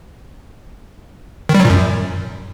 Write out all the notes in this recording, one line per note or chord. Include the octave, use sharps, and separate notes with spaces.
D#3
G3
F#3
A#2
F#2